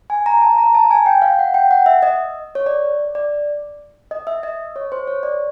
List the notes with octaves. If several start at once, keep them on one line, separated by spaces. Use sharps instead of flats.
G#5
A#5
A5
A#5
A5
G#5
G5
F5
F#5
G5
F#5
E5
D#5
C#5
D5
D5
D#5
E5
D#5
C#5
C5
C#5
D5